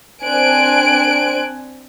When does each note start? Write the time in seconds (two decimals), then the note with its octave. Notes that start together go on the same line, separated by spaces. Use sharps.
0.23 C4 D4 C5 G#5 F#6 D7